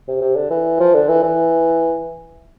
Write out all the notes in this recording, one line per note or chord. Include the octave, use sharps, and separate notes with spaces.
C3
C3
D3
E3
F3
D3
E3
E3